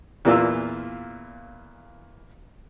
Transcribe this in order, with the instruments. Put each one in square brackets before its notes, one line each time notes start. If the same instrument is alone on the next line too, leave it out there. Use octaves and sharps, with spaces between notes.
[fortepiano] E2 A#2 E3 A#3 F4 E6